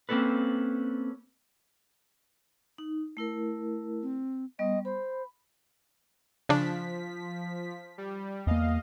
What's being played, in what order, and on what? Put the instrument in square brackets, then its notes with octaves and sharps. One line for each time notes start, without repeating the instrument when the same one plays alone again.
[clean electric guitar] A#3 C4 C#4 A4 B4
[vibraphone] D#4
A3 E4 A#4
[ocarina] C4
[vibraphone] G3 B3 [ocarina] D#5
[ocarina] C5 [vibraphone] B5
[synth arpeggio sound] C#3 D4 [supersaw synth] F3 B6
[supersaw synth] G3
[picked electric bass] E2 A#3 [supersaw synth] D#5 F5